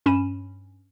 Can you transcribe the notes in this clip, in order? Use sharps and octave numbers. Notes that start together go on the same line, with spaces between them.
G2 C#4 B5 D#7 E7